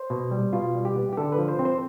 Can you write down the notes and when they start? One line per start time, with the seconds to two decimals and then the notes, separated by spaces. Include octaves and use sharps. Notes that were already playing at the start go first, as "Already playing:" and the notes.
Already playing: C5
0.10 B2
0.31 G3
0.53 B2 F4
0.75 G3
0.85 G4
0.96 B3
1.13 G4
1.17 D3 A4
1.32 B4
1.38 F3
1.48 C5
1.59 C4
1.65 C5